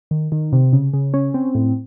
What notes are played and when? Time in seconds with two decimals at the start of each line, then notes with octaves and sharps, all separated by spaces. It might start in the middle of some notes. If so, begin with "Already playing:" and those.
0.11 D#3
0.32 D#3
0.53 C3
0.73 C#3
0.93 C#3
1.14 C#4
1.34 C4
1.55 A2